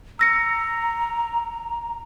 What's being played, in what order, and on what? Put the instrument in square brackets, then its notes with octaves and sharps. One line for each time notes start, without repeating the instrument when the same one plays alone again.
[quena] A#5 [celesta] E6 A#6 C#7